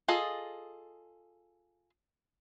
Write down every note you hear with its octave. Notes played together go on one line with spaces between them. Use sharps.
F4 G#4 A4 D#5